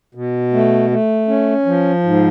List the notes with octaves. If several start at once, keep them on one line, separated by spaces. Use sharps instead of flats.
B2
A3
A3
C#4
F3
G#2